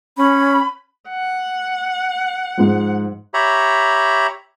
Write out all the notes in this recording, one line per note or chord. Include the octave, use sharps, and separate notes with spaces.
C#4 B5
F#5
G#2 F3
G4 C#5 E5 A#5 B5